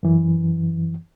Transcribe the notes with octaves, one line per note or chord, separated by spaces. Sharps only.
F#2 E3